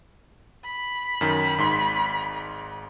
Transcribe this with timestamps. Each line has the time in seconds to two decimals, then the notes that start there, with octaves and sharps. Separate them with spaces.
0.64 B5
1.21 F#2 D#3
1.58 G#1 G#2 C6